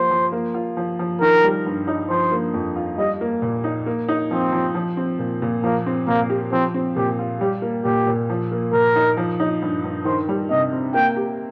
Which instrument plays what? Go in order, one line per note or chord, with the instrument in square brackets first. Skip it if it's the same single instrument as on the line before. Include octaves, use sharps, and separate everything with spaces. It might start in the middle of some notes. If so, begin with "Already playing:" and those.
Already playing: [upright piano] F3 A#3 G4 [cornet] C5
[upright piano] F3
A#3
F4
F3
F3
[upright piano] D#3 [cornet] A#4
[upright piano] G3
G2
D#4
[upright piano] F3 [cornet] C5
[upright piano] A#3
F2
F4
[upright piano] G3 [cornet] D#5
[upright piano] A#3
A#2
D#4
A#3
D#4
[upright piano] F3 [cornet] C4
[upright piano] F3
F3
C4
A#2
A#2
[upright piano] F3 [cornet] A#3
[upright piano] C4
[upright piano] A#2 [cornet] A#3
[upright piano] G4
[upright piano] F3 [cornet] C4
[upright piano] C4
[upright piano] A#2 [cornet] G4
[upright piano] F4
[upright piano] G3 [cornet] G4
[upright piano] A#3
[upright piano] A#2 [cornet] G4
[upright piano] A#2
F3
A#3
[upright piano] A#2 [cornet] A#4
[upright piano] D#4
F3
D#4
G2
G2
[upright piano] D#3 [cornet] C5
[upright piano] G3
[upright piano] C3 [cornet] D#5
[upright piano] C4
[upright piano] A#3 [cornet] G5
[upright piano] G4